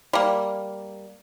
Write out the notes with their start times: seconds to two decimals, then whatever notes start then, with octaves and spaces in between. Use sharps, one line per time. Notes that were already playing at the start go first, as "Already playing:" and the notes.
0.13 G3 A#3